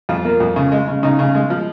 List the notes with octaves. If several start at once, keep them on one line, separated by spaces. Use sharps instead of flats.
F2 F4
A#3
F2
C#3
G#3
C#3
C#3 D#4
C#3
G#3
F3